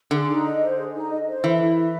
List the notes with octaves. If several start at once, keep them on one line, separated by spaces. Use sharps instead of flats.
D3 G#4
D#4
D#5
C5
G#4
D#4
D#5
C5
E3 A4
E4
E5